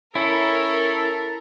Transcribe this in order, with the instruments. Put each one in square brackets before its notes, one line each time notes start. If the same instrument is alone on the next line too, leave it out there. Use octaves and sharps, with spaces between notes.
[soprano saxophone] C#4 [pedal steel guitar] E4 [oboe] A4 [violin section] A#4